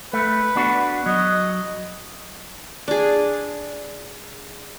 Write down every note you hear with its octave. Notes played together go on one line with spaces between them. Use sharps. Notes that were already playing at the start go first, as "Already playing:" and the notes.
A3 B4
B3 D4 F#4
F#3 D#5
D4 G#4